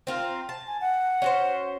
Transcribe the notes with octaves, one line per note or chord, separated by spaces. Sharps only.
C4 F4 A#4
A5
G#5
F#5
C#4 F#4 C5